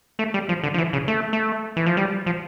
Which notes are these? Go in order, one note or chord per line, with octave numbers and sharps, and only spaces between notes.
A3
G3
F3
D3
F3
E3
C#3
A3
A3
E3
F3
G3
F3